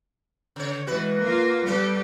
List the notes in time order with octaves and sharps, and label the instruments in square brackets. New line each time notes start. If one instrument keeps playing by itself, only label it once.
[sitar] C#3 C#5
[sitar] B2 F#4 B4 [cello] E3 G#3
[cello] A#3 F4
[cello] G3 G4 [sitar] B3 A4 B4